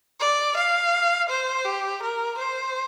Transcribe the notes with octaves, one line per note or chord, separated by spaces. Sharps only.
D5
F5
C5
G4
A#4
C5